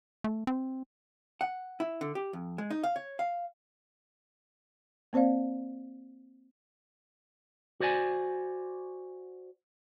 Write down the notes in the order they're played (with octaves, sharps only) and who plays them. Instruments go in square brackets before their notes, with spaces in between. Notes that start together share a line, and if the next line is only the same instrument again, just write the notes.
[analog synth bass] A3
C4
[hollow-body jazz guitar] F#5
E4
D3
G4
F2
G#3
D#4
F5
C#5
F5
[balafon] A#3 C4 C5 D5 F5
[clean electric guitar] F#4 C5 D5 G#5